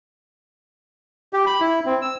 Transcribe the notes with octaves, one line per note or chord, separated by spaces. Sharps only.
G4
B5
E4
C4
E6